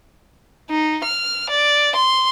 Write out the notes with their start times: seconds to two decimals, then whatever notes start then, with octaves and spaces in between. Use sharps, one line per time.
0.70 D#4
1.04 F6
1.50 D5
1.96 C6